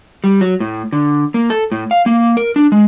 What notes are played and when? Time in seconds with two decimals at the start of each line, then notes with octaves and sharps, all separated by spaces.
0.24 G3
0.41 F#3
0.60 A2
0.92 D3
1.34 A#3
1.50 A4
1.72 A2
1.91 F5
2.06 A#3
2.37 A#4
2.56 D4
2.72 G#3